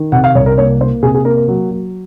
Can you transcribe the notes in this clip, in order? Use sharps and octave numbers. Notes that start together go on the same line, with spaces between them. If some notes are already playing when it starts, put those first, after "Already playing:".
Already playing: D#3
C3 F#5
F5
C2 C#5
A#4
A#3 C#5
A#3 C5
C3 G#4
G#4
A#3 A#4
A#4
F#3
F#3